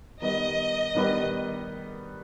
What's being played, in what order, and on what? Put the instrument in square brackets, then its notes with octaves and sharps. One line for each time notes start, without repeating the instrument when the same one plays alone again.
[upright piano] D#3 G3 B3 G4 B4 [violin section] D#5
[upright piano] D#3 G3 B3 G4 B4